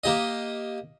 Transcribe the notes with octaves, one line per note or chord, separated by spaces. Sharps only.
A#3 G4 D#5